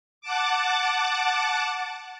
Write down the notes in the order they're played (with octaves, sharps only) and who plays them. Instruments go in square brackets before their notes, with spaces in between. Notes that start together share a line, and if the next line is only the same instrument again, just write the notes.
[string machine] F#5 A5 D6